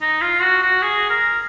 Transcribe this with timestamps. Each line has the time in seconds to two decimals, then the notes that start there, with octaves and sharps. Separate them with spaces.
0.01 D#4
0.21 F4
0.42 F#4
0.62 F#4
0.82 G#4
1.10 A#4